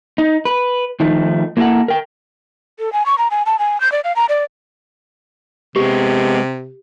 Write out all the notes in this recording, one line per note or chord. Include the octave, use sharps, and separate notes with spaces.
D#4
B4
D#3 F3 A3 D#4
A#3 E4 F#4 A4 A#4 F#5
A#4 G5
A4
G#5
C#6
A#5
G#5
A5
G#5
G6
D5
F5
A#5
D5
C3 G#3 B3 G4